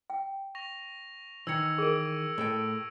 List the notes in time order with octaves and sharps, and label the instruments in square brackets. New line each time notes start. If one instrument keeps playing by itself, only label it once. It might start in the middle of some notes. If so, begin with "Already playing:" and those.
[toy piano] G5
[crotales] C#6 A#6 F7
[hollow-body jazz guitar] D#3 E3 [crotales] E6 G#6 C#7
[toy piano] G#4 A#4 [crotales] C#6 D7
[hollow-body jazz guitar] A2 A4 G5